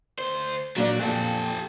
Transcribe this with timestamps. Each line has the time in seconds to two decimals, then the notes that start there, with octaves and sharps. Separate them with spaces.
0.19 D2 C5
0.76 A#2 F#3 D4 D5
0.99 F2 A#2 G4 A4